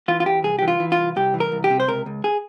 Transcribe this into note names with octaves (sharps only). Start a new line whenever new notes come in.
E3 F4
F4
E2 G4
C2 G#4
E3 G4
F4
E3
F4
C2
C2 G4
E3
A#4
C2
G4
C3
C5
C#2 A#4
C#2
G#4